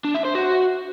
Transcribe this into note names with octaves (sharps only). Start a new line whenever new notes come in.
D4
E5
C5
F#4